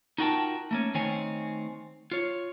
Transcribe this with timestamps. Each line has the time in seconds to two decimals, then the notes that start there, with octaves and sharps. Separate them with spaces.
0.18 D#4 F4 F#4 A#4 G5 A5
0.71 A3 A#3 C#4
0.94 D#3 A3 C4 C#5 G#5
2.12 F4 C#5